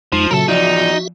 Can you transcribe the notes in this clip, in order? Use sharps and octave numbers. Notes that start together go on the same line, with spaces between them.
F2 F3 G#3 D#4
A#2 C#3 F#3 F#4 A4 A#4 E5
E2 F3 D#4 F4 D5